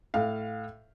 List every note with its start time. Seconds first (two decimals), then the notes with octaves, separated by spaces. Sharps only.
0.14 A2 F5